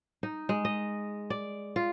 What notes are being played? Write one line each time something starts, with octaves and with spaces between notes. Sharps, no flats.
D#4
G#3
D#5
D5
F4